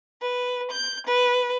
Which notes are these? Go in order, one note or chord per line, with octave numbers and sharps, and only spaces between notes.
B4
G6
B4